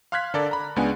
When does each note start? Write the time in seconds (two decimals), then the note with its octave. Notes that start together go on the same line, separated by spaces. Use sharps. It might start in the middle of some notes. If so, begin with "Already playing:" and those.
0.12 F5 C6 F6 F#6 G#6 B6
0.34 D3 A4 A#4 D5
0.51 A#5 B5
0.76 C#2 G#3 B3 D4 F#5 G#5